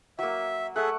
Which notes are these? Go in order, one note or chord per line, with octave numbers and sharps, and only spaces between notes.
F#3 A#3 E5
A3 G#4 A4 E5 F#5